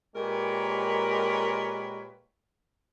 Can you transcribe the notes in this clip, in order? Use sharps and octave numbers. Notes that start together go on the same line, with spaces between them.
A#2 G#3 G4 A#4 B4 C#5